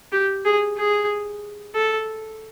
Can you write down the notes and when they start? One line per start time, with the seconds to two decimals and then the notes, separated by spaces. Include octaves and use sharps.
0.12 G4
0.45 G#4
0.77 G#4
1.75 A4